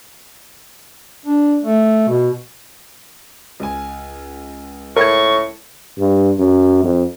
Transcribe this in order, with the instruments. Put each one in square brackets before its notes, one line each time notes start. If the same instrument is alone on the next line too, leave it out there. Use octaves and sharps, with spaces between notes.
[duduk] D4
A3
B2
[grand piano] C#2 G#5
[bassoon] A2 [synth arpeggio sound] A#4 G#6 [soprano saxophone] C#6
[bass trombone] G2
F#2
F2